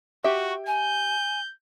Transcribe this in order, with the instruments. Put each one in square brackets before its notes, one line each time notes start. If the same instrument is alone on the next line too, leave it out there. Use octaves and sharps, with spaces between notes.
[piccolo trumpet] F#4 [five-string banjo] G4 E5 [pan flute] C#6
[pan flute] G#5 [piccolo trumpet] G6